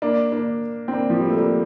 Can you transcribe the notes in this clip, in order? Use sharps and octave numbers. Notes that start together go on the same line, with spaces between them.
A#3 D4
A#3 D4
C4
A#3 D4
F3
G3
A3
G3 A#3